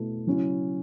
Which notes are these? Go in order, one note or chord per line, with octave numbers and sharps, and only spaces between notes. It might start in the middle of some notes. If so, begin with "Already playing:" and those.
Already playing: B2 A3 E4
C#3 F#3 C#4 E4